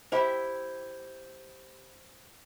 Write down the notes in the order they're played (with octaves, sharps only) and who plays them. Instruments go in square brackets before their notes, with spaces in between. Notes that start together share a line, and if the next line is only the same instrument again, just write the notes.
[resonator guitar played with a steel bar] E4 G4 E5 [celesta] C5